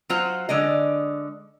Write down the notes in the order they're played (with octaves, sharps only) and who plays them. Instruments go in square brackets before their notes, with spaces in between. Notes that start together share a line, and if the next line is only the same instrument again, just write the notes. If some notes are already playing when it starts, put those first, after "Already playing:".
[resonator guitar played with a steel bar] F#3 F4 C5 F#5
D3 G#3 D5 D#5